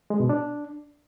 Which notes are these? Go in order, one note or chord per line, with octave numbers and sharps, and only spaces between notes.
G#3
B2
D4